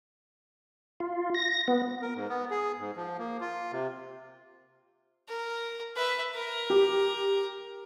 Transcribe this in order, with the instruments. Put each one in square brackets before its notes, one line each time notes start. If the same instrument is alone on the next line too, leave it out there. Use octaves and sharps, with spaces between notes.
[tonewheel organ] F4
A#6
B3
[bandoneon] A#4
G#2
B3
G#4
G#2
F3
A#3
F4
C3
[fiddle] A#4
B4 E5
A#4
[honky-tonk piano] G4